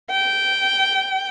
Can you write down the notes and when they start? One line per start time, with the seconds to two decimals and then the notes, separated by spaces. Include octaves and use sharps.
0.10 G5